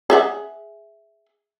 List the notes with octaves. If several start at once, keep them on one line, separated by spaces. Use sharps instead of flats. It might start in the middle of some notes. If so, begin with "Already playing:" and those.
G#4 E5 F#5